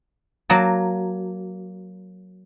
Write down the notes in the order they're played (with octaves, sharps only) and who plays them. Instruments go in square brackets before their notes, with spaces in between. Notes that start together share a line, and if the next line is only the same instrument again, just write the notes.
[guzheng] F#3 A#3 A5